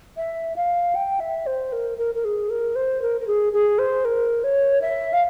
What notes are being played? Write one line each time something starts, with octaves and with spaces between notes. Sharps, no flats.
E5
F5
G5
E5
C5
A#4
A#4
A#4
G#4
A#4
C5
A#4
A#4
G#4
G#4
C5
A#4
C#5
E5
F5